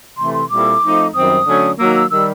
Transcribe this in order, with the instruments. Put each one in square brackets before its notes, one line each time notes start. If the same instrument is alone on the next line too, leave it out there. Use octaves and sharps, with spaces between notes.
[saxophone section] C3 E3 A3 [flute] C6
[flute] C6
[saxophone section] A#2 G3 C4 E4 A4 [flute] D6
[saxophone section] F3 A3 C4 D#4
[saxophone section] F#2 D#3 G3 C4 [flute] D#6
[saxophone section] D3 F#3 A3 C#4
[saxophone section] D#3 F#3 A#3 [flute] E6
[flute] E6
[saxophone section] D#3 G3 [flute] E6